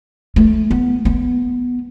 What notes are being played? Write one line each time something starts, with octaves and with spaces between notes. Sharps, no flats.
A3
B3
B3